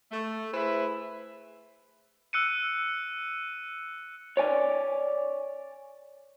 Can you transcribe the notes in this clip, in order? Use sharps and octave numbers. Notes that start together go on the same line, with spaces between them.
A3
E4 G#4 B4 C5 E5
E6 F#6 C#7 D#7
C#5 D5 G#5